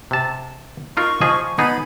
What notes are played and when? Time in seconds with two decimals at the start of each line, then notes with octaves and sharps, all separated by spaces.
0.11 C3 A5
0.97 D#4 F4 A#4 C#6
1.21 F3 G#4 D#5
1.58 B3 D#4 G#4 B5